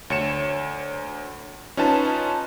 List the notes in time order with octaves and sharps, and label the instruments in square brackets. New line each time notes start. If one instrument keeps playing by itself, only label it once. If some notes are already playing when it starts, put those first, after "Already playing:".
[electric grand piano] D2 C#5 C#7 E7
C#4 D#4 F4 B4 A5